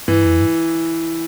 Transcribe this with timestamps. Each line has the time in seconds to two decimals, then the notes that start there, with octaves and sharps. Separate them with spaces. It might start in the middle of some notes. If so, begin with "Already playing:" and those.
0.08 G2 E3
0.26 F2
0.41 G2